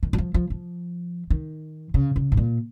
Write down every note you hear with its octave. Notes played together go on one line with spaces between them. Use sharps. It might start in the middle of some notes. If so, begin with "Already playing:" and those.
D#3
F#3
F3
F3
F3
D#3
C#3
C#3
G#2
A#2